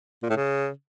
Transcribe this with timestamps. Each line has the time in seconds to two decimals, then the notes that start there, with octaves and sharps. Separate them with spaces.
0.23 A#2
0.30 A2
0.37 C#3